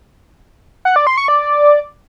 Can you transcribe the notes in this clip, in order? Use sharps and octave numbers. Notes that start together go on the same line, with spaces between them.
F#5
D5
C6
C#6
D5